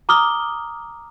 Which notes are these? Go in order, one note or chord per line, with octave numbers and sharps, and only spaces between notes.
A#5 D6 D#6 F6 G7